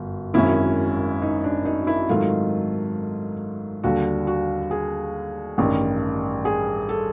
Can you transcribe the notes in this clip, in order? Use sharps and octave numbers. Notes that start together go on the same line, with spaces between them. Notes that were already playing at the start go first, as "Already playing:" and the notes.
Already playing: G1 F#2
G#1 F#2 D#3 G#3 C#4 E4
D#4
D4
D#4
E4
G#2 D#3 F#3 A3 F4
D#2 D3 G3 F#4
F#4
G#4
A1 G2 D#3 G3
G#4
A4